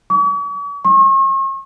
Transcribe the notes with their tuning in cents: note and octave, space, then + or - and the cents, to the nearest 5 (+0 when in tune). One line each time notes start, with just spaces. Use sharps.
C#6 +45
C#6 -45